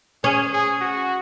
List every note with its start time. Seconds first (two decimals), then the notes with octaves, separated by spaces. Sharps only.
0.24 C#4 G#4
0.53 G#4
0.81 F#4